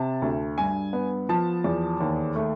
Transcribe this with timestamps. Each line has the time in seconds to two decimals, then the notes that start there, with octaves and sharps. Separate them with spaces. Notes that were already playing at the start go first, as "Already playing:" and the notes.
Already playing: C3 A5
0.22 D2
0.58 G2 G#5
0.93 B3
1.29 F3 A5
1.64 E2
2.00 D#2
2.36 A3